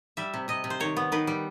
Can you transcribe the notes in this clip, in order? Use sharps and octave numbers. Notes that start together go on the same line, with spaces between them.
G3 E5
C3
C3 D#5
C3
C5
D#3 C#5
B3
D#3 B4
G3